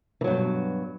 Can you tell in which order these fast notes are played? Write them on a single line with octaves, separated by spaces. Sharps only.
E3 F#3 G2 B2